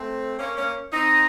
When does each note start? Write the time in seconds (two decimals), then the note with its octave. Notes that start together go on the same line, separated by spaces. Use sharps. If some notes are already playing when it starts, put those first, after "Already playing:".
Already playing: A3 C4
0.39 A#3 C#4
0.57 A#3 C#4
0.92 C4 D#4 D#5